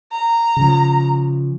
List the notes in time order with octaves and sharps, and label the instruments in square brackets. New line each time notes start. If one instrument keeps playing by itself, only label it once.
[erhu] A#5
[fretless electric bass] C#3 F3